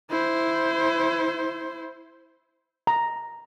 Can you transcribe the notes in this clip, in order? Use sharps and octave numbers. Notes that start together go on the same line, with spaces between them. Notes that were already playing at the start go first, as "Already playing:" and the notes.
E4 C5
A#5